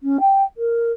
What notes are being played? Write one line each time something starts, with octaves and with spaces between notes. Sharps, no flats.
C#4
G5
A#4